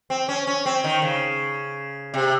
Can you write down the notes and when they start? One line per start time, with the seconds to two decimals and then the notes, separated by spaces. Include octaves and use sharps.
0.10 C4
0.29 C#4
0.47 C#4
0.66 C4
0.84 D#3
1.02 C#3
2.14 C3